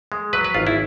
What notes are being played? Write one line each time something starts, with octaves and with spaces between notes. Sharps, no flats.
G#3
F#3 B4
B4
G#1 F4
E4